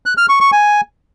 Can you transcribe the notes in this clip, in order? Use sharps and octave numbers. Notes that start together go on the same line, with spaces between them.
F#6
F6
C#6
C#6
G#5